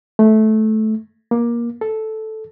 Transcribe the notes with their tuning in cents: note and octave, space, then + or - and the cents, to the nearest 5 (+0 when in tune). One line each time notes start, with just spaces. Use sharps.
A3 -15
A#3 +20
A4 -5